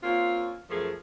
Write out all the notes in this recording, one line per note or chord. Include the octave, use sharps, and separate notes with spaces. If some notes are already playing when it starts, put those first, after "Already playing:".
A#3 C4 C#4 F4
F#2 F3 A3 G#4 A#4